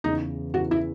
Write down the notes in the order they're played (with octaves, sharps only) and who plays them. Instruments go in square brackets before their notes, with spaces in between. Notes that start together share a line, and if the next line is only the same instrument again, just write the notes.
[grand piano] E2 C#3 E3 [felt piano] D#4
[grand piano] E2 C#3 E3 [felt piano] F#4
[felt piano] E4